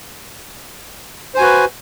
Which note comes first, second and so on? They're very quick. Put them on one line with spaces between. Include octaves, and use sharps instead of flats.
C5 G#5 F#4 B4